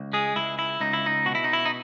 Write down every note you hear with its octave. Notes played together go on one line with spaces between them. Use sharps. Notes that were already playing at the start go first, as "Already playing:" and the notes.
Already playing: C#2
G#3 G#4
C#2 E4
E4
C#2 D#4
E4
D#4
B2 F#4
E4
D#4
E4
D#4